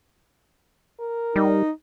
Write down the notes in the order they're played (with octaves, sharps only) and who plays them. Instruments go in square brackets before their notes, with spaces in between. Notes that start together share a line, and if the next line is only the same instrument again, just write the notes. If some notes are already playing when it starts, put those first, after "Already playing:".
[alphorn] A#4
[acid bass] G3 [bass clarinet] D#4